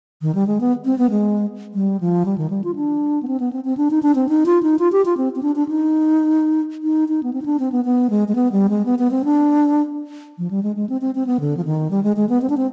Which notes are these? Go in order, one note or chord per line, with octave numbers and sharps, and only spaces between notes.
D#3
G3
G#3
B3
C4
B3
G#3
G3
F3
G3
D#3
G3
F4
D4
B3
C4
B3
C4
C4
D4
D#4
D4
C4
D#4
F4
D#4
F4
G4
F4
C4
C4
D4
D4
D#4
D#4
D#4
B3
C4
D#4
D4
C4
B3
B3
G#3
G#3
B3
G3
G#3
B3
B3
C4
D4
F3
G3
G#3
G#3
C4
C4
C4
B3
D3
F3
D#3
G3
G#3
G#3
B3
C4
D4
C4